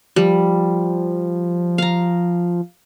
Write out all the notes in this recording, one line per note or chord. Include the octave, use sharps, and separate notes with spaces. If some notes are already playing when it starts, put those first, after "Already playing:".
F3 G3
F5 A#5